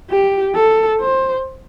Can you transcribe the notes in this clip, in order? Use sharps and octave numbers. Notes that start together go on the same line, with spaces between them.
G4
A4
C5